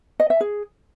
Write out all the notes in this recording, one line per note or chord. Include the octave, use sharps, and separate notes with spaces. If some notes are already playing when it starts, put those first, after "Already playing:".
D#5
E5
G#4